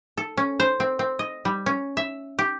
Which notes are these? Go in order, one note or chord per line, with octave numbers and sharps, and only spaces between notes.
A4
C#4
C5
C4
C4
D#5
G3
C#4
E5
G4